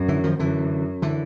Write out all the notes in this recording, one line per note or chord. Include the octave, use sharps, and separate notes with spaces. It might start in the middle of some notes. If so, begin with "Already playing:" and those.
Already playing: F#2
D3 E3
D#3 F3
F#2 D3 E3
D3 E3